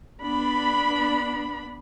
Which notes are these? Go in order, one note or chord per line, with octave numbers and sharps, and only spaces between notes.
B3 D4 B5